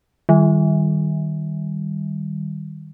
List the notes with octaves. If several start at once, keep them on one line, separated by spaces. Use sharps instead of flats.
D#3 G3